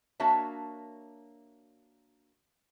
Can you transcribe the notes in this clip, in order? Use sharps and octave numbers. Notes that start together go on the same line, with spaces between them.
A#3 D4 F#4 C#5 E5 A5